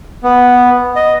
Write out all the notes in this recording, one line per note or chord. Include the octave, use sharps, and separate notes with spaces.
B3
D#5